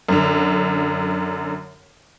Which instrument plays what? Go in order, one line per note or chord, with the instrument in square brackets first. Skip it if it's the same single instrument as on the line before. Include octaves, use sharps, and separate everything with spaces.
[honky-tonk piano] F#2 D3